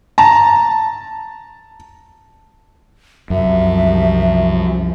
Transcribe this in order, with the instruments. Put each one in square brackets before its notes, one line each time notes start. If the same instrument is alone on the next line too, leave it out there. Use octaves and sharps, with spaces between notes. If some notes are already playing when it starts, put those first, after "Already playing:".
[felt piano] A5 A#5
[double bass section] C2 F3 [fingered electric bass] F#2 [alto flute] E5